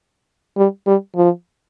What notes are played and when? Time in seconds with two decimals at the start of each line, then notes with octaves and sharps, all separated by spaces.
0.57 G3
0.87 G3
1.16 F3